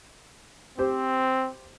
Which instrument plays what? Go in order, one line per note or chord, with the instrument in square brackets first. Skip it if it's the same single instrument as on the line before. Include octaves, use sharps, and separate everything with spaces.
[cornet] C4 [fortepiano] G4 C5